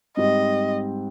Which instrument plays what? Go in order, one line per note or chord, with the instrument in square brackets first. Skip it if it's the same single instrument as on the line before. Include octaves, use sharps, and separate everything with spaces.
[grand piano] G#2 G3 C4 G4 [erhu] D#5